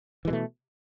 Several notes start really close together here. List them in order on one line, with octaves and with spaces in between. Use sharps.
E3 G#3 B2 A3